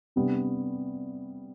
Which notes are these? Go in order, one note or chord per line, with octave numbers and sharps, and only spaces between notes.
C3 G3 B3 D4